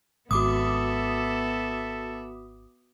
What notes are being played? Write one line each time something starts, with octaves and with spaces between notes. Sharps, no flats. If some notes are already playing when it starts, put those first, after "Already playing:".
G#1 B3 F#4 A4 E5 D6 D#6